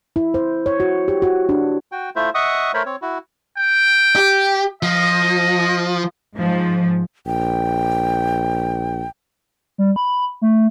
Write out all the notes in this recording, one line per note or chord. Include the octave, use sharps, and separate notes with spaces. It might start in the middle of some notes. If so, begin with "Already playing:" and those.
E4
C5
C#5
F#4
G4
F#4
D4
F#4 G5
A3 E4 F4 C5 E5
D#5 E5 F#5 C#6 D#6
A3 A#4 C5 C#5 B5
C4 C#5
E4 F#4
G5
G4
F3 D#5
G#2 F3
A#1 G5
G3
B5
A3